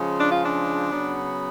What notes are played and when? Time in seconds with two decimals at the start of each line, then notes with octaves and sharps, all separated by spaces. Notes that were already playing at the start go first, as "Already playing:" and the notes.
Already playing: C#3 F3 G#3 C#4
0.17 D4
0.30 F4
0.43 D4
0.92 C#3 F#3 B3